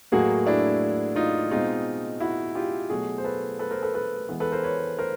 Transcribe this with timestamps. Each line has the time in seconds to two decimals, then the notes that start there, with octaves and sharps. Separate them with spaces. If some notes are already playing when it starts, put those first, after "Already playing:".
0.12 A2 F#3 A#3 F#4 G#4
0.47 D4 E4
1.16 D#4 F4
1.51 B2 G#3 C4 D#4 F4
2.20 E4 F#4
2.55 F4 G4
2.90 B2 F#3 A3 F#4 G#4
3.18 C5
3.24 A4 B4
3.59 A4 B4
3.71 A#4 C5
3.82 A4 B4
3.94 A4 B4
4.29 E3 G#3 B3
4.40 A4 B4
4.52 A#4 C5
4.64 B4 C#5
4.99 A#4 C5